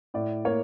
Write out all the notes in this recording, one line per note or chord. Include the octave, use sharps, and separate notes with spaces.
A2 D5
A#3 C#5